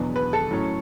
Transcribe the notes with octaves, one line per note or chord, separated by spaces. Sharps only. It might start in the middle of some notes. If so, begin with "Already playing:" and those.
Already playing: E2 B2 F#3 B3 D4
B4
A4
A2 F#3 C#4